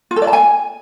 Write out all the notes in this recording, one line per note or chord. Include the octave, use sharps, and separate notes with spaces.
F4
A4
D5
A5
G#5